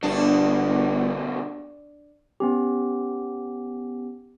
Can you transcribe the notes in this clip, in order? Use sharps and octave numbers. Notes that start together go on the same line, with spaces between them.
G1 B2 D3 D4
B3 C#4 G4